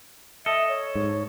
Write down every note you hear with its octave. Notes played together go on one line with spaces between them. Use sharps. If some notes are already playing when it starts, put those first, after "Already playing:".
A4 D#5 E5
C#5
G#2